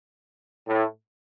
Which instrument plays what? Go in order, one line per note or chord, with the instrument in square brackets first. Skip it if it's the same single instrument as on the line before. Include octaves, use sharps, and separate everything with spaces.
[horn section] A2